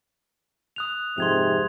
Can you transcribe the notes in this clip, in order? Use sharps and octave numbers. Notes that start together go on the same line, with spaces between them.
D#6 F#6 F7
F2 G#2 C3 C6 G#6 F7